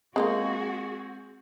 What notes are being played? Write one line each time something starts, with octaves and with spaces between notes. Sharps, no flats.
G#3 A#3 C4 F4 F#4 G#4